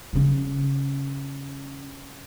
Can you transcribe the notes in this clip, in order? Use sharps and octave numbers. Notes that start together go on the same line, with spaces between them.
C#3 C#4